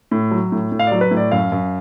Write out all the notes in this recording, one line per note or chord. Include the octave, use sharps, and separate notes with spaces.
A2
F#3
A2
A2
F5
F#3 D5
B4
A2
D5
F#2 F5
F#2